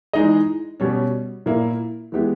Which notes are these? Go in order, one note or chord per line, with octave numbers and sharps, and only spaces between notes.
E3 G#3 D#4 G#4 D#5
B2 G3 C#4
A#2 A#3 E4
E3 G#3 B3 E4 G4